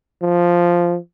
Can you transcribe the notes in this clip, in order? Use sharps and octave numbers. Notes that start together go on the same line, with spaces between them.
F3